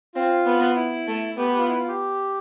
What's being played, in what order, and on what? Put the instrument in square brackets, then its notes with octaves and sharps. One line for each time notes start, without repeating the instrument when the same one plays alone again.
[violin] C4 [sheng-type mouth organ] F4
[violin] B3
[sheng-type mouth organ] E4
[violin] A3
[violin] B3 [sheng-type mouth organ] G4 B4
[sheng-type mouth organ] G4
F4
E4
F4
G4